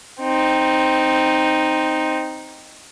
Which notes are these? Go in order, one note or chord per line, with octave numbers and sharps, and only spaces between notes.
C4 D#4